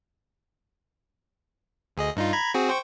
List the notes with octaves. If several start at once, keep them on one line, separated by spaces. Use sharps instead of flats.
D2 G#4 D#5
G2 D#4 F4
A#5 B5 G#6
C4 F#4 G#4
C5 G5 C#6